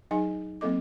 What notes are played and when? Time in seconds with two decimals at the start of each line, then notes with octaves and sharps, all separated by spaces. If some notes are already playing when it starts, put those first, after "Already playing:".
0.11 F#3 D#4 G#4 D#5 G#5
0.61 F#3 A#3 C4 A4 D#5 D6